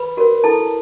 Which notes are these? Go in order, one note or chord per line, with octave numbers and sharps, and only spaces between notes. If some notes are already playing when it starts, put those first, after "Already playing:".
Already playing: B4 B5
F#4 A#4 C#5
E4 A4 A5